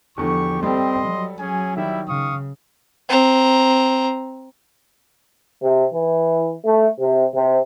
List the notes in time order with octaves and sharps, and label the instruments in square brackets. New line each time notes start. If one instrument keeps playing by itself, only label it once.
[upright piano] E2 D3 [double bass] F3 [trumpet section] G4 C#6
[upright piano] G3 A4 [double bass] C4 [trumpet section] D#5 C6
[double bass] F#3
[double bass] F#3 [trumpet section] C#4 G#4 G#5
[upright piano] D#3 [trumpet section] G3 E4 E5
[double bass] C#3 [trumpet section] F5 C#6 D#6
[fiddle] C4 A#5
[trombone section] C3
E3
A3
C3
C3